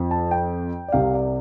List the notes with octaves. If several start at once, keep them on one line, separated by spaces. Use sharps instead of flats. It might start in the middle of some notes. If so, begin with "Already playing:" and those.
Already playing: F2 F3
A5
G5
D5
C2 C3 G3 F5
D5